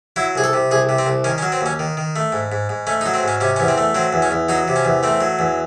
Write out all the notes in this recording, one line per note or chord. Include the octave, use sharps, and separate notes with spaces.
F#3 E4
C2 G#4
A4
C3
C2 G#4
C3
C4
C2
D#3 C#4
C#4
F#3
C4
D#2 C#4
D#3
D#3
A3
G#2
G#2
G#2
A3 C#4
D#4
F#3
C4
G#2 C#4
C3 C#4
E2 C#4
C4
A3
F#3 C4
E2
C#4
E2
F#3 D#4
C3
C#4
E2
A3 C4
F#3
E2